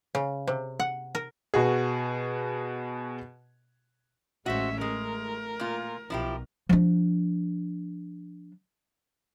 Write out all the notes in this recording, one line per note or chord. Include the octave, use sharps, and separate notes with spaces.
C#3
C3
F#5
A#4
B2 F#4 G#4
A1 G#3 C#4 F#4 C5 E5
G#3 A3 A#4
A#2 F4
B1 F3 E4 G4
F3 D4